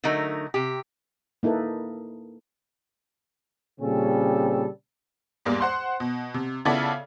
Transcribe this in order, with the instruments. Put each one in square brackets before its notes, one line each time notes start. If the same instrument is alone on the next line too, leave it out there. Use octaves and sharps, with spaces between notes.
[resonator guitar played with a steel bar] D3 F#3 A3 D#4 A#4
C3 G4
[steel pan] A#3 D#4 E4 A4 B4
[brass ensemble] A#2 C#3 G3 C4 C#4 A4
[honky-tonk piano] E2 G#2 G3 A#3
C5 F#5 C6
B2
C3
C#3 B3 E4 F4 A4 D5